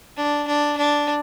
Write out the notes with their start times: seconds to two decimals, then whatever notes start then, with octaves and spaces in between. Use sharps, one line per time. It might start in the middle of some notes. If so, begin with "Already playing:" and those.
0.17 D4
0.47 D4
0.77 D4